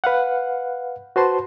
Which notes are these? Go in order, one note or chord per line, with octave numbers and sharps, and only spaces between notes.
B4 F5 F#5
F#4 B4 C5 A5 C6